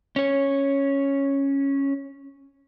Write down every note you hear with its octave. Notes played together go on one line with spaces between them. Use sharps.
C#4 C#5